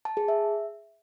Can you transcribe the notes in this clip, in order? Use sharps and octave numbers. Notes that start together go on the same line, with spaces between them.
A5
G#4
E5